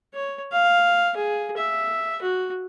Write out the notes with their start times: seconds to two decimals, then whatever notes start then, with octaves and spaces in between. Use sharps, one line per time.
0.14 C#5
0.52 F5
1.16 G#4
1.57 E5
2.22 F#4